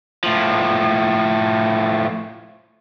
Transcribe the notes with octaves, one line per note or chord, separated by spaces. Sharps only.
A2 F3